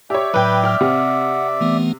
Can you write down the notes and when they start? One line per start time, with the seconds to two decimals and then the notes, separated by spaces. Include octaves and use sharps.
0.10 G4 C#5 D5 E5
0.34 A2 F#3 B4 G5 G6
0.64 G5 F6
0.81 C3 F#5
1.61 E3 A3 B3